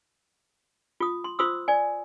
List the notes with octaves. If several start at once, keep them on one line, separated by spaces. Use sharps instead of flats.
F4 D#6
C6
F4 C5 C6 D#6 E6
D5 G#5